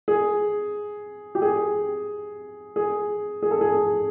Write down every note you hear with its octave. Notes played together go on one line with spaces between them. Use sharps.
G#4
G4
G#4
G#4
G#4
A4
G#4